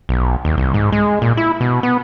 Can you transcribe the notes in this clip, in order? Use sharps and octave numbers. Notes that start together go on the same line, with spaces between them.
B1
D#2
C2
G#2
G#3
A#2
E4
B2
B3